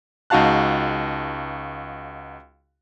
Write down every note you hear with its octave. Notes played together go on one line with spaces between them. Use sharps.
C#2 D#4 F#4 F5 A5 F#6